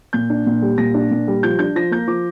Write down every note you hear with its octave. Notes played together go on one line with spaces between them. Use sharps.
A#2 G6
D4
A#2
G3
A#2 A#6
D4
A#2
G3
F3 G6
D4 G6
F3 A#6
A#3 G6
F3 D6